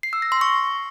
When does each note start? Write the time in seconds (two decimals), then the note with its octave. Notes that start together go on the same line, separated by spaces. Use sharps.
0.03 C7
0.13 E6
0.22 A#6
0.32 C6
0.41 C#6